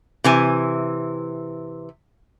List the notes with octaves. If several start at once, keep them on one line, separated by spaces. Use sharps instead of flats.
C3 E3 G#5